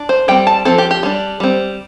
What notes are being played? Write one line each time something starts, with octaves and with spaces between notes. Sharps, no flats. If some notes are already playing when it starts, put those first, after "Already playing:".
Already playing: D4
C5
G3 C4 G5
A5
F3 C4 A4
G4
G4
G3 D4
G3 C4